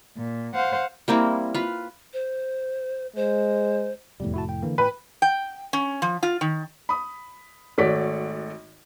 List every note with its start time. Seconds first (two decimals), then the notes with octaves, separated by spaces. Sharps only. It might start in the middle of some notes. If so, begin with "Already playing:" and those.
0.16 A#2
0.53 C5 F5 F#5
1.08 G3 A#3 C4 E4
1.54 F4 B4
2.13 C5
3.16 G#3 C5
4.20 F1 E2 A2 G3
4.34 E4 F#4 A5
4.49 G5
4.63 D3 E3 A#3
4.78 A2 B4 G5
5.22 G5
5.73 C#4
6.02 F3
6.23 F4
6.41 D#3
6.89 B5 D#6
7.78 G#1 A3 F#4 C#5 D5 B6